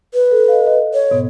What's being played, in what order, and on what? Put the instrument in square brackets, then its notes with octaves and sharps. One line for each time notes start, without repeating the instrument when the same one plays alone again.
[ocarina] B4
[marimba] A4
D#5 F5
D#5
[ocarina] C#5
[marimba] G#2 B2 B3